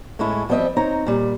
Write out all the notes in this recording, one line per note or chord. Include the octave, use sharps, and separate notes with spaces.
A2 G#3 A3 C#4 E4
F3 G3 B3 C4 D#5 E5
C4 D#4 C#5 A#5
A#2 G3